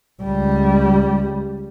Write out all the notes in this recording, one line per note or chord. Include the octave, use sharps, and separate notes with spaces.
C#2 G3